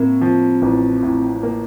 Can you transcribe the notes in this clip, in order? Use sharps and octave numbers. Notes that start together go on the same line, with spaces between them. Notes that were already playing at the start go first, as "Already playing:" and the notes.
Already playing: A2 A#3 C4
F3
A1
A2
A#3